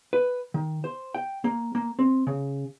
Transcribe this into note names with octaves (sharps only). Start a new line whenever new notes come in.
B4
D#3
C5
G5
A#3
A#3
C4
C#3